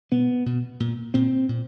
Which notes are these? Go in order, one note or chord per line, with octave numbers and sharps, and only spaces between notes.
B2 B3
B2
A#2
A#2 C4
A#2